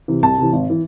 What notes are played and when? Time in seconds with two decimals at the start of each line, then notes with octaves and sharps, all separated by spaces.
0.08 C3 E3
0.22 C2 A5
0.38 C3 E3
0.53 G#1
0.70 E3